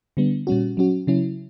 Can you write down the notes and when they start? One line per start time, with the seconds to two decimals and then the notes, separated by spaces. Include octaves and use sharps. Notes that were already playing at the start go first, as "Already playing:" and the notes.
0.17 D3 G3 B3 D4
0.47 A#2 G3 C#4 F#4
0.77 F#3 C#4 F#4
1.07 C#3 F#3 C#4 E4